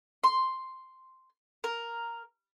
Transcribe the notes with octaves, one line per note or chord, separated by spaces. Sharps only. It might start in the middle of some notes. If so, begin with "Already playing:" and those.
C6
A#4